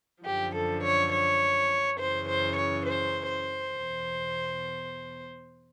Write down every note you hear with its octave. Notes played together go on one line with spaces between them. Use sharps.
F#2 D3 F3 G4
A4
C#5
C#5
F#2 C#3 E3 C5
C5
C#5
C5
C5
E2 B2